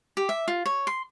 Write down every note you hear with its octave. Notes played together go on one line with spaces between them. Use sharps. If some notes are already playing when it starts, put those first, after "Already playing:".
G4
E5
F4
C#5
C6